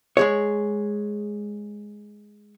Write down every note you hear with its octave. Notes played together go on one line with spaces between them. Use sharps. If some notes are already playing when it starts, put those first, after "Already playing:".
G#3 G#4 C#5